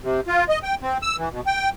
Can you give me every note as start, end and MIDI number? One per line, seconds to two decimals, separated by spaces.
0.03 0.21 48
0.28 0.44 65
0.49 0.59 75
0.63 0.75 79
0.82 0.98 60
1.02 1.17 88
1.18 1.29 52
1.32 1.41 47
1.46 1.69 79